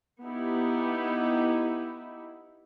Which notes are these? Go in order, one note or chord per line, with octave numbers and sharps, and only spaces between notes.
B3 D#4 E4 G4